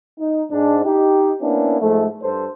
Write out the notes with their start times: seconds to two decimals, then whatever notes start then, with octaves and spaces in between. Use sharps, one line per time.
0.19 D#4
0.51 G#2 D4
0.84 D#4 G4
1.41 A#3 B3 C#4 D4 E4
1.80 G#2 F3 A3
2.22 G2 A4 C5